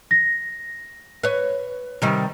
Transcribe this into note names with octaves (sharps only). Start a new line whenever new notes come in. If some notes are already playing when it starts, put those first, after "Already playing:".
A#6
B4 C#5
C3 D#3 G3